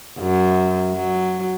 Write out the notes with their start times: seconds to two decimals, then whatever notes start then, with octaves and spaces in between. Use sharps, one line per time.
0.19 F#2
0.91 F#3